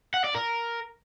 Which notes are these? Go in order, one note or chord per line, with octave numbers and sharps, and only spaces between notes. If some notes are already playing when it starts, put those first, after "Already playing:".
F#5
D5
A#4